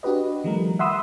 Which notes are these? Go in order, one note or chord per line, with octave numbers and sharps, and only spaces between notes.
D4 F#4 G4 B4 D#5
D#3 F3 G3 A3 A#4
E5 F#5 B5 C6 D#6 E6